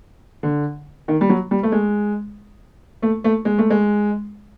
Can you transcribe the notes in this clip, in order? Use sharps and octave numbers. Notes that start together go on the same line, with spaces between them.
D3
D#3
G3
F#3
G3
A3
G#3
A3
A3
G#3
A3
G#3